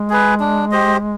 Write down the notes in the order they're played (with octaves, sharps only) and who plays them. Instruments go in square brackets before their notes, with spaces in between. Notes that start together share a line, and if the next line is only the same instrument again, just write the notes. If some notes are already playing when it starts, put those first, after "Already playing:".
Already playing: [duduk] G#3
[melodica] G#4 B4
D4
G4 C5 D#5